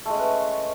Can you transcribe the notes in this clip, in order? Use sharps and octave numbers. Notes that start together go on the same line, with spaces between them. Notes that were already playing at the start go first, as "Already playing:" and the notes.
G#3 A3 C#4 B4